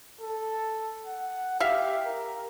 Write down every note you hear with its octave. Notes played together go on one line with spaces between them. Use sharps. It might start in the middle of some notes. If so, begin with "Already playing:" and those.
A4
F#5
G4 E5 F5
A#4